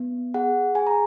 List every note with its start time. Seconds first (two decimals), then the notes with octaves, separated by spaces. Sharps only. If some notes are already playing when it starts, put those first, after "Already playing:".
Already playing: B3
0.34 G#4 F#5
0.75 G#4 G#5
0.87 A#5